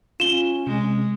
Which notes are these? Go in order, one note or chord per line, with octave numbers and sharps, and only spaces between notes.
C#4 F4 E7 G7
C3 G#3